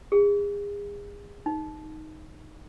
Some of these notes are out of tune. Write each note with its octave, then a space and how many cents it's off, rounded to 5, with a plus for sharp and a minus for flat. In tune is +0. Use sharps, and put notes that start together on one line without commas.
G#4 -35
D#4 +0